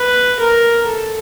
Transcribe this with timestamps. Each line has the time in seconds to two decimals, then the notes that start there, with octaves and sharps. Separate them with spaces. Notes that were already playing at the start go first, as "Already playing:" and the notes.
Already playing: B4
0.40 A#4
0.87 A4